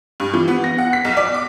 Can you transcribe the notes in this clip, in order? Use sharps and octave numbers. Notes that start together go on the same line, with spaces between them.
G2
E3
B3
A#6
F#5
B6
B1
D5
D6